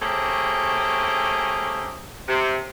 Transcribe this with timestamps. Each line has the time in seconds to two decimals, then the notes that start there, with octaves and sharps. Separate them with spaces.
0.01 A3 A#3 C4 C#4 G4 G#4
2.29 C3